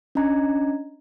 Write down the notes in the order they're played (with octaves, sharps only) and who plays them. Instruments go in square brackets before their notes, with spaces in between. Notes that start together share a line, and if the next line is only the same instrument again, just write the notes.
[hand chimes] C#4 D4 D#5 A#5 G#6